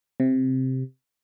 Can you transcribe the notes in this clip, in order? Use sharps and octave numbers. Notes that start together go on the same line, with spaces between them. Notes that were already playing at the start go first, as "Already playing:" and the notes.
C3